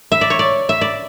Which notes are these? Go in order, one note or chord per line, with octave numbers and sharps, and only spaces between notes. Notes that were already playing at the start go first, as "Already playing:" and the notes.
E5
D5
C#5
D5
E5
D5